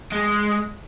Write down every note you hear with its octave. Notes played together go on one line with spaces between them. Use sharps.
G#3